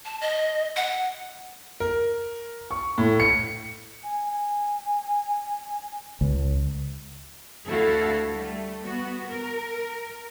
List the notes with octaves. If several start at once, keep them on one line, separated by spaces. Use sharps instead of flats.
A5
D#5
F#5
A#4
C#6
A2
C#7
G#5
G#5
C#2
D2 A3 E4 F#4 A4 F5
G3 A3
B3 F#4
A#4